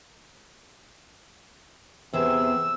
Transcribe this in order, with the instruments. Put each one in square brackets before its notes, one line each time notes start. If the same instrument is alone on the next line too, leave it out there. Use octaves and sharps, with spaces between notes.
[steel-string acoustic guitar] E2 B3 G#4 [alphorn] C3 [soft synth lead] E6